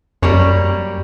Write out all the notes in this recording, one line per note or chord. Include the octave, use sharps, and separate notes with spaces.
F#2 G3 A#3 C#5